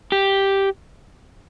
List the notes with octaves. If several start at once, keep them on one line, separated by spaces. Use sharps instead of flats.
G4